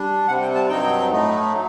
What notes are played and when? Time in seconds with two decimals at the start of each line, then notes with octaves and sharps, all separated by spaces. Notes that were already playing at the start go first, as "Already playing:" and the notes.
Already playing: G3 D4
0.28 C3 G3 C4 F#5
0.42 G5
0.55 A5
0.69 G2 F#3 C4 D#4 G5
1.11 A2 A3 D#4
1.53 F#3